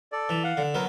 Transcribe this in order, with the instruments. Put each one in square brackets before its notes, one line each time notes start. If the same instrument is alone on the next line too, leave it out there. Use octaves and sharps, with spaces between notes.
[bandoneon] A4 D5
[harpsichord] E3
[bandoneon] F5 F#5
[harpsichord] D3
[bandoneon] D3 A#4 [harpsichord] F#3 B3